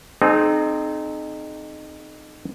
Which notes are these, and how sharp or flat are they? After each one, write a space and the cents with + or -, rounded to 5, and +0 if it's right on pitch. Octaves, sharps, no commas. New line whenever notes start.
C4 +0 D#4 -20 G#4 +40